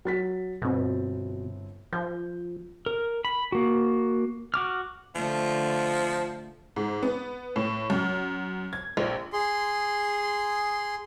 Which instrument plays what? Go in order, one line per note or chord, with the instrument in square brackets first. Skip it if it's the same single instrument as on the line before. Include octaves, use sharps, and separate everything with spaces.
[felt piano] F#3 A6 B6
[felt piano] G1 C4 [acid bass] B2
[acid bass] F3 [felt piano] G6
[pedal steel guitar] A#4
B5
A#3 F#4
F#4 D6 F6
[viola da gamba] D3 A3 [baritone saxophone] F3
[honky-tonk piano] G#2
B3
A2
F#2
G#6
A#1
[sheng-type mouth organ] G#4 C6